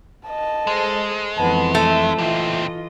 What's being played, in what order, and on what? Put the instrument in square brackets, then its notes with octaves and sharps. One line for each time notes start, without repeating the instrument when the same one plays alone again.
[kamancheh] D#5 A5
[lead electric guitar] G#3 [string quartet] G#4 A4 C5
[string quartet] F2 E3 [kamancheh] B3 A5
[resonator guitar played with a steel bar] A3 [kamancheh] E5
[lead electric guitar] A#2 C4 [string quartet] E3 F4 D#5